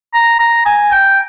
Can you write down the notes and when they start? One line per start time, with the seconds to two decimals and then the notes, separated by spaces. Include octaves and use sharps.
0.14 A#5
0.39 A#5
0.66 G#5
0.92 G5